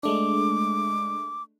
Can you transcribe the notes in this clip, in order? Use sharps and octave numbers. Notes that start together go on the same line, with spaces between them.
G#3 A3 D4 D6